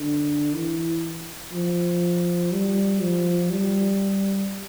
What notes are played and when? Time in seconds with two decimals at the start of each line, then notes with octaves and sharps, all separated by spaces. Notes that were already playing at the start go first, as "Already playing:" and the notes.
Already playing: D3
0.54 E3
1.52 F3
2.52 G3
3.02 F3
3.50 G3